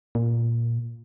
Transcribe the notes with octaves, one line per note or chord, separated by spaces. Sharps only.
A#2